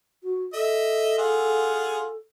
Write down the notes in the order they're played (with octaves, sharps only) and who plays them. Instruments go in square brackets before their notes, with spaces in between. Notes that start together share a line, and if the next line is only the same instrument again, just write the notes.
[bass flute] F#4
[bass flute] A4 [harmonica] D#5 E5
[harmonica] F4 G#4 F#5